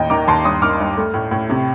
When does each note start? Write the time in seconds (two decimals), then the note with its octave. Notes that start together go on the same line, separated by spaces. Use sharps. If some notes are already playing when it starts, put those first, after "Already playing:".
Already playing: D#2 A2 D#5 G5
0.10 D#3 A#5 D6
0.28 D#2 A5 C6
0.45 G2 C6 D#6
0.62 D#3 D6 F6
0.80 G2
0.97 A3
1.14 A2
1.31 A2
1.50 C3